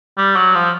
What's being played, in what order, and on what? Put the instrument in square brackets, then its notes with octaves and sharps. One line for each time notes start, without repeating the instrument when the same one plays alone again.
[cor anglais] G3
F#3
F3